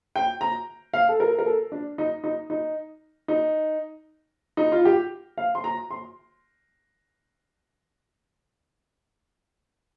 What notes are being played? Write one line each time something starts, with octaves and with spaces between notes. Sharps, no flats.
G5
A#5
F5
A4
A#4
A#4
A4
D4
D#4
D#4
D#4
D#4
D#4
F4
G4
F5
C6
A#5
C6